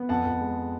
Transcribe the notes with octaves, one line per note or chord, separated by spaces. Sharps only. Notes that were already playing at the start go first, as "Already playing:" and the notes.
Already playing: B3
F2 F#5 A5
F2
G#3